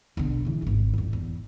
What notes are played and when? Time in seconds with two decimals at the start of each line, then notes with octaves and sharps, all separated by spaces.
0.17 B1 D3
0.45 C#3 E3
0.62 D#1 G#1
0.94 A1 F2
1.13 E2